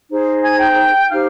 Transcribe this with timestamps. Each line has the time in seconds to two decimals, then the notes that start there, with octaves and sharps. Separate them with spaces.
0.10 D#4 G#4 C5
0.44 G#5 G#6
0.60 G5 G6
1.10 D#4 G4 C5 F5 F6